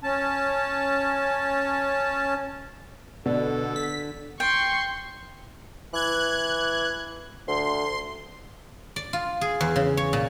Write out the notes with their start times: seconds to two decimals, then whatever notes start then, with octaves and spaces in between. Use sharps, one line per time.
0.03 C#4 A5
3.26 B2 D3 A4
3.76 B6
4.40 G5 C6 C#6
5.93 E3 F#6 G#6
7.48 D2 C6
8.96 D5
9.13 F4
9.41 G#4
9.61 E2
9.76 C#3
9.97 C#5
10.13 A#2